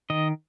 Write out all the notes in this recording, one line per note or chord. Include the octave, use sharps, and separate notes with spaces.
D#3 D#5